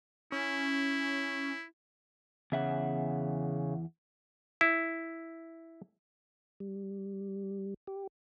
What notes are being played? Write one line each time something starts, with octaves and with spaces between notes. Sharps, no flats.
C#4 E4
E2 C#3 E5 F#5
E4
G3
G4